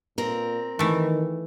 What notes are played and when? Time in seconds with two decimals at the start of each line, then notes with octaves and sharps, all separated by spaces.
0.18 A#2 C4 A#4
0.79 D#3 E3 A3